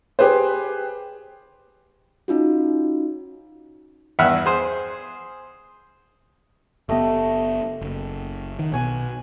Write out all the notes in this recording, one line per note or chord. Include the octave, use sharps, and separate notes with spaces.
G4 G#4 B4 C5
C#4 D#4 F4 F#4
E2 G2 E5 F#5 F6
G#4 C5
F#1 A3 B3 G4 D#5
F#1
D#3 F#5
B1 B2 F#5 G#5 C#6